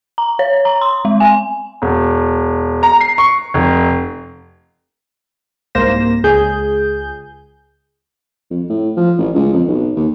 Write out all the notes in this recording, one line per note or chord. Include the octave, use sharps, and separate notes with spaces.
A#5
C#5
A#5
C6
G#3
G#5
E1
A#5
C7
C#6
F1
C2 G#2 A#3 C5 A#6 E7
C#2 G#4 G6
F2
A2
F3
A1
C#2
F2
B1
D#2